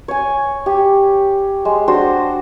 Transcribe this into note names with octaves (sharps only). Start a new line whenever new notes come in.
C#5 G#5
G4
G#3
D4 F#4 C5